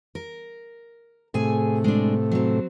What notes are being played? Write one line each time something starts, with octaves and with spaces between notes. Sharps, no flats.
A#4
A2 C3 A3 G#4 G#5
G#3 D4
F#3 C4